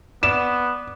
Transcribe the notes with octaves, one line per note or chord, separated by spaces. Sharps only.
B3 D5 E7